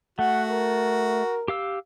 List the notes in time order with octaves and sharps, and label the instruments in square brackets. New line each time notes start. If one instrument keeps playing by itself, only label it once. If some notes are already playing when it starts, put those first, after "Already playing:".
[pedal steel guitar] A3 [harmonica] F#4 [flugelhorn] F#5
[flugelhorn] A#4
[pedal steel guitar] G4 F5 E6